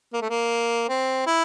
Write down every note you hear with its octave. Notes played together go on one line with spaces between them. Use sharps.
A#3
A3
A#3
C4
E4